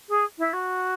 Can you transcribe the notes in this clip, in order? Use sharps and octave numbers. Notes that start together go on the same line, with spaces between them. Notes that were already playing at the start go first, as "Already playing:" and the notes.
G#4
E4
F#4